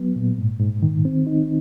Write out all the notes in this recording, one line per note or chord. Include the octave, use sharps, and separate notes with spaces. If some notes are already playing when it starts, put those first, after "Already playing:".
Already playing: F#3 B3
A#2
G#2
G#2
D#3
C4
D#4